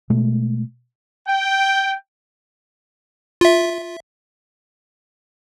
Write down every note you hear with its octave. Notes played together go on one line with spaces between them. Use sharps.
B2 G#3 A3
G5
F4 E5